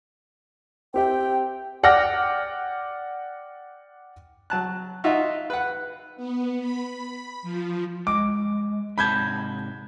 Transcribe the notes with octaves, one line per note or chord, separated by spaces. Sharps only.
C4 G4 E5 G5
D5 F#5 G5 D6 F6 A#6
F#3 A5 F#6
D#4 F4 F#4 E5 F5
B4 F#5
B3
B5
F3
G#3 D6
G#2 C3 A5 B5 G6 G#6